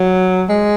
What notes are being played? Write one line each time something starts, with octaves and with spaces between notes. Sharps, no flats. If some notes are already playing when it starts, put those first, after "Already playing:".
Already playing: F#3
G#3